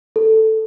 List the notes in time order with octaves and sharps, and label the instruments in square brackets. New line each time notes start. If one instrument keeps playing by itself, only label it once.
[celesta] A4